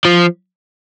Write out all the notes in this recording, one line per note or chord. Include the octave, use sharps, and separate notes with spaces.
F3